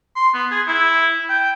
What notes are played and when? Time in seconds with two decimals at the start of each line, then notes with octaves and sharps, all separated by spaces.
0.16 C6
0.34 B3
0.51 G#4
0.68 E4
1.29 G5